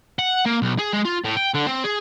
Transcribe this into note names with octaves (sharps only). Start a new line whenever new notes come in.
F#5
A#3
B1
G#4
G#3
F4
A2
G5
D3
C4
G#4